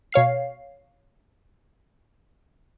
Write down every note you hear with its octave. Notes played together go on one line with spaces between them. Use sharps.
B2 C#5 F5 C7